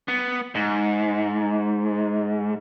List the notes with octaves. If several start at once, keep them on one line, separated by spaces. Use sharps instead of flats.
B3
G#2